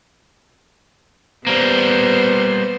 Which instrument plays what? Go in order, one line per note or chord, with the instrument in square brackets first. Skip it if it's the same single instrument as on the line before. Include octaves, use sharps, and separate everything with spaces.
[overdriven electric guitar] G3 A#3 [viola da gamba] B3 C5